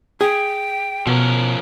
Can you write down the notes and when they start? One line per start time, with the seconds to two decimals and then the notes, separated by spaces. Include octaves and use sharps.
0.21 G#4 G5
1.07 B2 F3 C#4 A#4